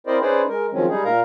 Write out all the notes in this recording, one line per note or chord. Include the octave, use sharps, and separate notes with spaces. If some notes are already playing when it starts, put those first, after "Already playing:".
C4 E4 A#4 C5 D5 D#5
C#4 D#4 G#4 B4 C5 D5
G#3 A#4
D#3 F3 F#3 G#3 C4 C#4
G3 G#3 D#4 G#4
A#2 A#4 F5 A#5